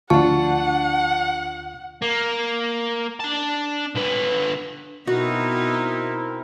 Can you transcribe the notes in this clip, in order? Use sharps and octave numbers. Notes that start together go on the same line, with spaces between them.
D2 F3 D4 F4 F#5 A5 C#6
A#3
D4 A5
D3 B4
B2 B3 C4 D#4 E4 F#4 A#4